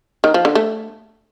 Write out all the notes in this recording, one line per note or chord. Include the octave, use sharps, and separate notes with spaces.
D#3
F3
D3
A3